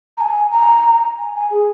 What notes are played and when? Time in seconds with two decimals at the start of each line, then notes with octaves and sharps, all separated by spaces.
0.17 A#5
0.21 G#5
0.51 A#5
1.18 G#5
1.35 G#5
1.50 G#4